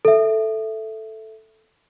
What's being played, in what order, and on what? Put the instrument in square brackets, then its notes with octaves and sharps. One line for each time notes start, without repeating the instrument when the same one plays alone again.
[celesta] A4 E5